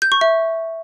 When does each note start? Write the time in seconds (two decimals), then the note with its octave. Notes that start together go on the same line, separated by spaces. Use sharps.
0.02 G6
0.12 C#6
0.21 E5